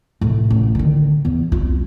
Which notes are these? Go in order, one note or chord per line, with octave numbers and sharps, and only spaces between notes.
A2 C3
A1
D3 D#3
E2
C2 F4